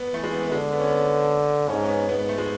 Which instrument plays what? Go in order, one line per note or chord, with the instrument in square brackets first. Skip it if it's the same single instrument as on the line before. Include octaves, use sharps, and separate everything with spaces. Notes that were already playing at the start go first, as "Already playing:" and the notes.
Already playing: [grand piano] B3
[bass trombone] E3 [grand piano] A3
[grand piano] G#3
B3
B3
[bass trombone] D3 [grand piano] G#3
[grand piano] B3
C#4
B3
[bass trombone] G#2 [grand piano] C#4
[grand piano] C#4
B3
[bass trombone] G#2 [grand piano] B3
[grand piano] B3
A3
G#3